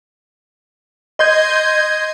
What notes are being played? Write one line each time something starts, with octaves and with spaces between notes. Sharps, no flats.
D#5 C6 G6 G#6